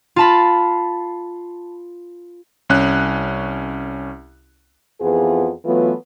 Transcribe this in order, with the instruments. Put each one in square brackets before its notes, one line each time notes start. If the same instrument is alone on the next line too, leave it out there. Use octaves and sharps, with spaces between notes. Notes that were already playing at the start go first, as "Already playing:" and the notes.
[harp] F4 A5 B5
[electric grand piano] C2 C#4 F#6
[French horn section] F2 E3 B3 F4 G#4
E3 F#3 A3 B3 F4 B4